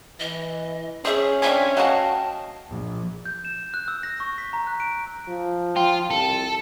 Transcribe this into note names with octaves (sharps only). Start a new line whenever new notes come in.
E3 D#5
C#4 G#4 C5 E5
F3 C4 D4 E5 G#5 G#6
F#3 F#4 D#5 F5 G5 A5
A#1
G6
E7
F#6
E6
A#6
C#6
B6
A#5
F#6
D7
F3
F4 G5
C2 A4